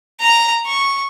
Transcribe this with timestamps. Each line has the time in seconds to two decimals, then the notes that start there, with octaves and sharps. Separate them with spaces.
0.21 A#5
0.66 C#6